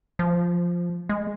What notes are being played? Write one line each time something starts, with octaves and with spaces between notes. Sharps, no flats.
F3
G#3